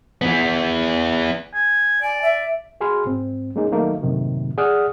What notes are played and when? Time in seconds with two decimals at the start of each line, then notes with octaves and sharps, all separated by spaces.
0.22 E3 B3
1.53 G#5
2.02 D5 G#5
2.22 E5
2.81 F#4 G#4 G#5 B5 C6 F6
3.06 G#2 C4
3.56 G#3 A#3 C#4 D#4 G#4
3.72 D#3 F#3 A3 A#3 D#4
4.02 F#2 A2 C3 D#3 F#3 A#3
4.58 G#4 D5 F#5 D#6 F6 F#6